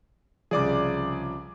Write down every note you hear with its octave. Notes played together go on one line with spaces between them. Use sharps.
C2 C#3 F3 G#4 D5 D6